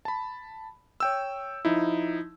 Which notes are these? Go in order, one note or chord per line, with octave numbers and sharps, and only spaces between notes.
A5 B5
C#5 G5 E6
F3 D#4 E4